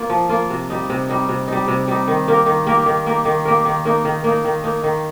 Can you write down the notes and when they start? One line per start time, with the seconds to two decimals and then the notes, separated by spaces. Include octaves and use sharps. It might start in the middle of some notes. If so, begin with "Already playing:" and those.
Already playing: A#3 F4
0.10 F3
0.29 A#3 F4
0.50 C3
0.70 G3 D#4
0.90 C3
1.09 G3 D#4
1.29 C3
1.48 G3 D#4
1.68 C3
1.88 G3 D#4
2.08 D#3
2.28 A#3 G4 A#4
2.46 D#3
2.67 A#3 G4 A#4
2.86 D#3
3.06 A#3 G4 A#4
3.25 D#3
3.45 A#3 G4 A#4
3.65 D#3
3.85 A#3 D#4
4.05 D#3
4.24 A#3 D#4
4.45 D#3
4.64 A#3 D#4
4.83 D#3